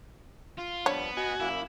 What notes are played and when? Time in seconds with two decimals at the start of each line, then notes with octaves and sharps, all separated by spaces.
0.58 F4
0.86 F3 G3 B3 D4 C#5
1.17 F#4 D#5 G#5
1.40 F#2 A#3 E4